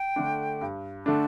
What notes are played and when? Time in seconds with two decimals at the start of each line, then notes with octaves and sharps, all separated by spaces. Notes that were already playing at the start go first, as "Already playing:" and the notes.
Already playing: G5
0.16 D3 A3 D4
0.61 G2
1.06 D3 A3 D4 A5